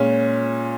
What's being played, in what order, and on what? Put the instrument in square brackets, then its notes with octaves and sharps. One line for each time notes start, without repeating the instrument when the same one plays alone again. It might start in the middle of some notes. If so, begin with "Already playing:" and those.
Already playing: [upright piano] A#2 G#3 C#4